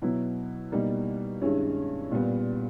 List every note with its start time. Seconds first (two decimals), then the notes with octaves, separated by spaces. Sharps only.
0.02 B2 F#3 B3 E4
0.72 B2 G3 A#3 D#4
1.41 G2 D#3 G#3 C#4 E4
2.11 A#2 G3 B3